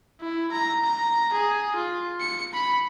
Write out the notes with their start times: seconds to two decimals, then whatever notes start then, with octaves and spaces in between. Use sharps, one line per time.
0.21 E4
0.52 A#5
0.83 A#5
1.34 G#4
1.76 F4
2.20 C#7
2.54 B5